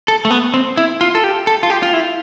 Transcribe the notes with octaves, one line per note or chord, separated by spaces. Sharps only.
A4
A3
B3
C4
E4
F4
A4
G4
A4
F4
G4
F4
E4